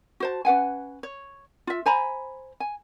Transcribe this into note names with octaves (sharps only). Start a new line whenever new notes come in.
F#4 C5 A5
C#4 B4 F#5 G#5
C#5
F4 E5
C5 G#5 A#5 B5
G#5